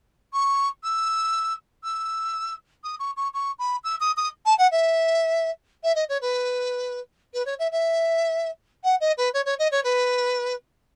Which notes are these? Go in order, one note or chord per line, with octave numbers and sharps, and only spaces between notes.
C#6
E6
E6
D#6
C#6
C#6
C#6
B5
E6
D#6
D#6
A5
F#5
E5
E5
D#5
C#5
B4
B4
C#5
E5
E5
F#5
D#5
B4
C#5
C#5
D#5
C#5
B4